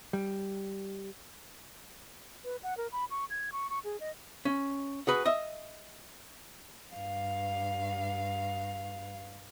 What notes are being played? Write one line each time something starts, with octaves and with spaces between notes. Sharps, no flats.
G3
B4
F#5
A#4
B5
C#6
G#6
C#6
C#6
G#4
D#5
C#4
F#4 G#4 B4
D#5 E5
G2 F5